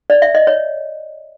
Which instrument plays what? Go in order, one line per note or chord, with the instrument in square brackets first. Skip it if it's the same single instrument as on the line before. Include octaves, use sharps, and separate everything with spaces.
[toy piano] D5
E5
D#5
C#5